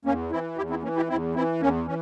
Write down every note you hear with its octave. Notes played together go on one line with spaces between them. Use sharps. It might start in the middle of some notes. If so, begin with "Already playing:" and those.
E2 A#3 C#4
E3 C4 E4
E2 E4 G4
C4 E4
E3 A#3 C#4
E4 G4
E2 C4 E4
E3 C4 E4
E2 A#3 C#4
E3 C#4